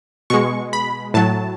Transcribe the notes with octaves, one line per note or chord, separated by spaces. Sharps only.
B2 G#3 C#6
B5
A2 F#3 A5